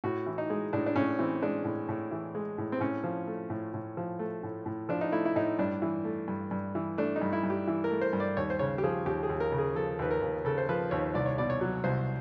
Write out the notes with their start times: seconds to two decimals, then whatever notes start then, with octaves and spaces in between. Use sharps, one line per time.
0.04 A2 F#4
0.26 E3
0.38 D#4
0.50 G#3
0.73 A2 D4
0.87 D4
0.96 A2 C#4
1.19 E3 C4
1.43 G#3 D4
1.65 A2
1.89 A2
2.11 E3
2.35 G#3
2.58 A2
2.72 C4
2.80 A2 C#4
3.04 F3
3.27 A3
3.50 A2
3.74 A2
3.97 F3
4.19 A3
4.43 A2
4.66 A2
4.89 F3 D4
5.01 D#4
5.12 A3 E4
5.25 E4
5.36 A2 D#4
5.59 G2 D4
5.82 E3
6.05 A3
6.28 G2
6.51 G2
6.75 E3
6.98 A3 D4
7.16 D#4
7.21 G2
7.33 E4
7.44 G2
7.50 G4
7.68 E3
7.84 A#4
7.91 A3
8.01 C5
8.13 G2
8.20 D5
8.37 D#2 C#5
8.50 C5
8.59 C#3 C#5
8.78 G4
8.83 F3 G#4
9.06 D#2 G4
9.23 G#4
9.30 D#2
9.40 A#4
9.52 C#3
9.58 G#4
9.76 F3 A4
9.99 D#2 B4
10.11 A#4
10.21 D#2
10.45 C#3 A4
10.58 C5
10.69 F3 B4
10.91 D#2 C#5
11.14 C2 D5
11.26 C#5
11.38 B2 D5
11.50 C#5
11.61 F#3
11.84 C2 C5